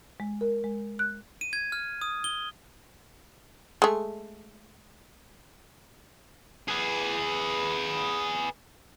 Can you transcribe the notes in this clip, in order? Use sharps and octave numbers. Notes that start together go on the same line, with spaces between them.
G#3
A#4
G#3
F#6
D#7
G#6
F6
D#6
G7
G#3 A3
G#4 B4